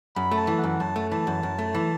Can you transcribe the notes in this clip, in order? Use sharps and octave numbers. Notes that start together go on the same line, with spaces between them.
F#2 B5
A3
A5
E3
F#5
F#2
F#2 A5
A3
E3 A5
F#2
F#2
A3
E3